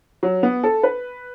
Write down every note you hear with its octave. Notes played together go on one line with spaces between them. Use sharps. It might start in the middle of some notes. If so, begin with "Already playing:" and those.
F#3
B3
A4
B4